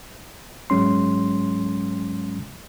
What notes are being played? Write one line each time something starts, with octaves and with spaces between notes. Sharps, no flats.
G#2 F#3 G#3 C#4 C6